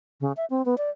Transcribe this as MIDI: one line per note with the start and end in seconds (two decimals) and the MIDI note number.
0.21 0.32 49
0.37 0.45 76
0.50 0.64 60
0.65 0.77 59
0.78 0.90 74